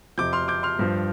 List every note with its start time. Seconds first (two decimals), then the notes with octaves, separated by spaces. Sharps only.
0.18 F2 C3 F3 D6 G6
0.33 C6 F6
0.48 D6 G6
0.63 C6 F6
0.79 G2 F3